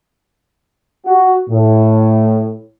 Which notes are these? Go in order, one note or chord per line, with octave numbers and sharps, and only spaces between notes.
F#4
A2